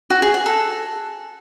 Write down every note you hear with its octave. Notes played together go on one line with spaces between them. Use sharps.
F#4
G#4
F#5
A4